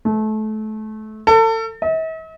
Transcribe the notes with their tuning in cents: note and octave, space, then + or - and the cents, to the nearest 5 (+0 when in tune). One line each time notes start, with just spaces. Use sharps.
A3 -25
A4 +35
E5 -45